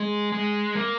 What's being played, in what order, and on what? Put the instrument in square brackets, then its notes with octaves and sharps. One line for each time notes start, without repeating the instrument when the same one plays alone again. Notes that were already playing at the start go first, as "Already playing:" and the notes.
Already playing: [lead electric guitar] G#3
G#3
A#3